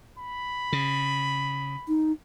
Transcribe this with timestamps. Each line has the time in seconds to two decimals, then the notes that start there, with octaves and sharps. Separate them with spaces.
0.19 B5
0.72 C#3
1.88 D#4